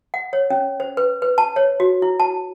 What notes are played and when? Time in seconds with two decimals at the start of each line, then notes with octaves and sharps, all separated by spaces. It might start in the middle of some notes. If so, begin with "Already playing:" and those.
0.14 F#5
0.33 C#5
0.50 C#4
0.80 C5
0.97 B4
1.22 B4
1.38 A5
1.56 C#5
1.80 F#4
2.02 E4
2.20 A5